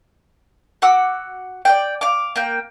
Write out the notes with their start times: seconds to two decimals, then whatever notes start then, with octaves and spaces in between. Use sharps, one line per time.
0.82 F#4 F#5 D6 E6
1.65 D5 F#5 G5
2.01 F5 D6
2.36 A#3 G5